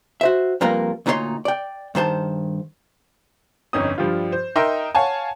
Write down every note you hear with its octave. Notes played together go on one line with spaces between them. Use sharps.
F#4 C5 E5
F2 G3 A#3 F4 A#4 B4
D2 A#2 D#4 E4 C#5 C6
D5 G5
G2 D#3 C5 A5
G1 F2 C#4 D#4 D#6
G2 F3 G3 F4
C5
D#4 A#4 D#5 E5 G5 C6
C#5 F5 F#5 G#5 A5